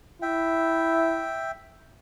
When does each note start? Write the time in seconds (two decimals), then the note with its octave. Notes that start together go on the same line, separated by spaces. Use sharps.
0.22 E4 E5 G5